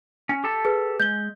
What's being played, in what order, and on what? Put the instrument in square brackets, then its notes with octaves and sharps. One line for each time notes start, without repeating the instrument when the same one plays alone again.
[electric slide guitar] C#4
G4 A4 A5
[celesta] G#4 B4
[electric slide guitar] G#3 [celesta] G6 G7